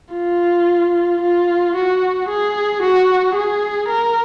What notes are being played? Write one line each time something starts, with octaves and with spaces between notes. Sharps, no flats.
F4
F4
F#4
G#4
F#4
G#4
A#4